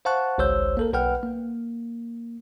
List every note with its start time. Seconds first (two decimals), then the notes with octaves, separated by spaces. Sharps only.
0.05 C5 F5 F#5 A5 C#6 F#6
0.38 G#1 C#2 C5 C#5 E6 G6
0.77 A#3 A4 A#4
0.93 B1 B4 F#5 G5 F6
1.23 A#3